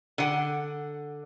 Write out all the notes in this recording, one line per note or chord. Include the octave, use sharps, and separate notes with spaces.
D3 F#5